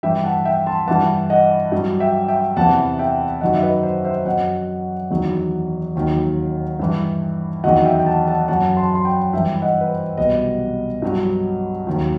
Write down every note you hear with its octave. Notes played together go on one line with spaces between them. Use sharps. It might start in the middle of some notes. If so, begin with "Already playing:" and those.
G2 E3 E5 G5
F#5 A5
E5 G5
A5 C6
G2 E3 F#5 A5
D#5 F#5
G2 F#3
E5 G5
E5 G5
E2 C3 E3 F#5 A5
E5 G5
F#2 D#3 F#3 D#5 F#5
E5
B4 D#5
C5
C5 E5
F#2 F#3 D#5 F#5
E2 D#3 F#3
D#2 D#3 F#3
G2 E3
E2 D#3 F#3 D#5 F#5
E5 G5
G5
F#5 A5
F#5 A5
F#2 F#3 F#5 A5
A5 C6
C6
G5 B5
G2 E3 E5 G5
D#5 F#5
B4
C5
C2 B2 F#3 B4 D#5
G2 F#3
D#2 D#3 F#3